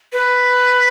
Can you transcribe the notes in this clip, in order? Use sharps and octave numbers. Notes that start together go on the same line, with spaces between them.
B4